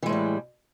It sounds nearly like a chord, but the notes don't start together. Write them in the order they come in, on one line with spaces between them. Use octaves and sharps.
E3 G#3 A2 G3